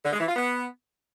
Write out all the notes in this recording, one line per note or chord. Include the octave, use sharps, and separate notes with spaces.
D3
G#3
E3
F4
B3